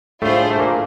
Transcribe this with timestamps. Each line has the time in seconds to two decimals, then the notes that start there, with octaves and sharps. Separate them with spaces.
0.22 A2 A3 D4 F4 G#4 C5
0.51 A3
0.59 A#2 A#3